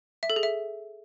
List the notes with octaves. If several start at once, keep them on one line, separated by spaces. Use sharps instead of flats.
E5
A4
G#4
E5